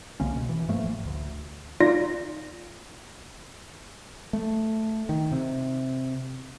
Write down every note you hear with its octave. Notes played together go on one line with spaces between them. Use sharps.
C2 D3 A#3 C#4
B2
E3
G2 F3 A3 A#3
A1
D2
D#4 F4 D5 A#6
A3
D#3
C3